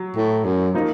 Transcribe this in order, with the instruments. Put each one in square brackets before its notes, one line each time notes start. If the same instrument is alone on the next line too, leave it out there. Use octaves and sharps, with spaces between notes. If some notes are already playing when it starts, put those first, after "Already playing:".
Already playing: [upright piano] F#3
[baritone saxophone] A2
F#2
[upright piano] F3 A#3 D#4